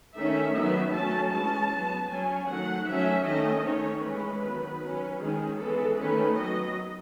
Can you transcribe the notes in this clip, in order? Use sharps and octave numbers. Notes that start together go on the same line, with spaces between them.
D#3 A3 C#4 E5
D#3 F#3 B3 E5
F#3 A3 C#4 A5
E3 G#3 C#4 A5
F#3 B3
F#3 C#4 G#5
D#3 F#3 A3 F#5
F#3 A3 C#4 E5
D#3 A3 C#4 D#5
D#3 A3 C#4 C#5
E3 G#3 C#4 B4
D#3 F#3 B3
F#3 C#4
D#3 G#3 C#4 G#4
E3 G#3 B3 A4
D#3 A3 C#4 B4
F#3 B3 D#5